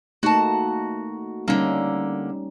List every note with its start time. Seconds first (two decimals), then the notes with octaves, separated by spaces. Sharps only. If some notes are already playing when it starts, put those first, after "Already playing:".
0.23 A3 A#3 D#4 F#4 A5
1.48 D3 G3 A#3 C#4 D#4